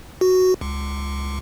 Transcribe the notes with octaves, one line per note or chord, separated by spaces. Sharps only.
F#4
C#2